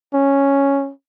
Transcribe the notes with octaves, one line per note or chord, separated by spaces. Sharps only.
C#4